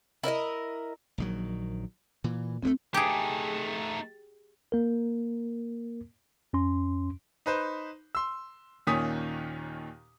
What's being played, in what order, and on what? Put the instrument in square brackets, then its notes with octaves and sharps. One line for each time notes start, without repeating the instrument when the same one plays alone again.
[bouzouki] E4 A#4 D5 D#5
[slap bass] A#1 D#3 F#3
A#2 E3
[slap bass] D2 G3 A3 [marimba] C4
[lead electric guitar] A3 D#4 [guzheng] G4 G#4
[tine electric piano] A#3 A#4
F2 C#4 C6
[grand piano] D#4 B4 C5
C6 E6
D#2 A#2 D#3 C#4 D#6 B6